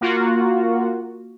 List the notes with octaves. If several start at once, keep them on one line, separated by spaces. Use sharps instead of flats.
A#3 F4 F#4